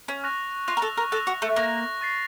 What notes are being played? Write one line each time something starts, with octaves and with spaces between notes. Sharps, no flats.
C#4
C#6 F#6 A#6 F7
F4 C#6 F#6 A#6 F7
A#4
A4
A#4
A4 F#6 A#6 F7
F#4
A3
A#3 F#6 A#6 F7
C#6 A6 C7